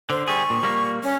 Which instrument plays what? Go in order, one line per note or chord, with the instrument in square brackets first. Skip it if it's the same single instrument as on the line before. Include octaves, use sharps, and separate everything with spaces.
[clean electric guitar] D3 [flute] C5
[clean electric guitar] G3 G#4 [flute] C#6
[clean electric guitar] A#2
G3 A#3
[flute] C#4